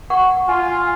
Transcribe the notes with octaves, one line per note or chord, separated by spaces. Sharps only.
F#5 C#6
F4 G#5